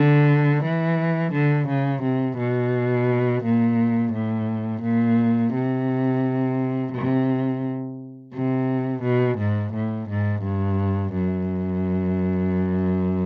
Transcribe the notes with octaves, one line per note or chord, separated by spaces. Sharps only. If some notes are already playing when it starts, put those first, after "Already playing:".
Already playing: D3
E3
D3
C#3
C3
B2
A#2
A2
A#2
C3
C3
C3
B2
G#2
A2
G#2
G2
F#2